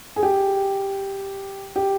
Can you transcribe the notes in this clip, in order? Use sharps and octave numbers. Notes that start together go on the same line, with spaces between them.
G#4
G4
G4